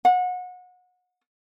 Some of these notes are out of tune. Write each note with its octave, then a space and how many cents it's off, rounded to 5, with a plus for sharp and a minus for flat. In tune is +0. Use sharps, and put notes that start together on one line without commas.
F#5 -30